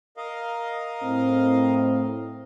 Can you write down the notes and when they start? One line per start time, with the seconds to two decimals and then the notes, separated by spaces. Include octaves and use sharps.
0.17 A#4 D#5 F5
1.03 A2 C4